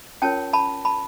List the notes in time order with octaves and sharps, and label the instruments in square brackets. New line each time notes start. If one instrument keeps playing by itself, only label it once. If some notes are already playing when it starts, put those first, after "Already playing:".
[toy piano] C#4 F4 A#4 C#5 G5 A5
A5 B5
A5 B5